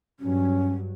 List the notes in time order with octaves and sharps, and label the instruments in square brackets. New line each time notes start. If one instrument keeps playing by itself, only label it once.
[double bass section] G2 F#3 [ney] C#4